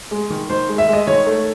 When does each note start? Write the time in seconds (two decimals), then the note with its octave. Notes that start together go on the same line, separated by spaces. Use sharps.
0.11 G#3
0.30 D#3
0.49 D#3 C5
0.69 G#3
0.78 E5
0.89 G#3 D#5
1.07 D#3 C#5
1.27 A3